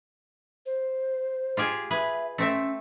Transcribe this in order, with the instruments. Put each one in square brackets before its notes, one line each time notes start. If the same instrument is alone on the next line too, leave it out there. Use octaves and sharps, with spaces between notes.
[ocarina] C5
[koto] F4 G4 G#4
[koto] G#4 B4 [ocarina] E5
[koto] A3 C4 E5 [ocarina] C#4